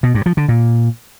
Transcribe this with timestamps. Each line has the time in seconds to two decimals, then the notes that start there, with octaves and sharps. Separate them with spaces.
0.03 B2
0.15 G2
0.26 F3
0.37 D3
0.49 A#2